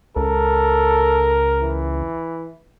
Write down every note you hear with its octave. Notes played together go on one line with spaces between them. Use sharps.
C#2 A4 A#4
E3